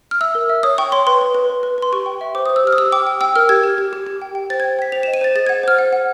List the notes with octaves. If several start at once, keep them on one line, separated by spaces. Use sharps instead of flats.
F6
E5 E6
A#4
E5
C#5 D#6
G5 C#6
C#5 C6
B4 C6
B4
B4
B4
B4
B4 C6
G4 C#6
G5
E5
C5 D6
D#6
C5
E6
G4 F6
D#6
G4 E6
G5 D6
G5
G5 E6
A#4 F6
G4 G#6
G4
G4
G4
G4
G5
G5
C5 A6
G#6
G5
G5 B6
C5 F7
E7
D#5
D#7
C5 A6
G#4 A6
G#6
F#5
C5 F6
F#5
F#5